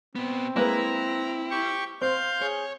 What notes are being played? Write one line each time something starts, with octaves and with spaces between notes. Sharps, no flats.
A#2 B3 C4
G#3 A#3 E4 B4 A#5
G4 C#6
C4 C5 F5 G6
G#4 C#5